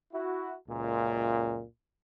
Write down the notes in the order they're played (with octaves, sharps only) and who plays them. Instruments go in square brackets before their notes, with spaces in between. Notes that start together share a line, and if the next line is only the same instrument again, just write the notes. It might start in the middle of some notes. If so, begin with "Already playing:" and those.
[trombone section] E4 F#4
C#2 F#2 A#2